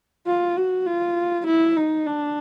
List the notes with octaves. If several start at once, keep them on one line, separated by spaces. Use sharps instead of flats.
F4
F#4
F4
E4
D#4
D4